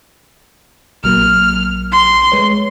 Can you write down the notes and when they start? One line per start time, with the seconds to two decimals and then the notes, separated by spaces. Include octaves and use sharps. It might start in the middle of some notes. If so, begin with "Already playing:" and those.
1.04 A#1 F#3 A#3 F6
1.92 C6
2.32 G#3 B4 C#5